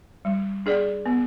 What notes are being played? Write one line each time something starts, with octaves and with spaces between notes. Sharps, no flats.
G3
D4 G#4 D5
B3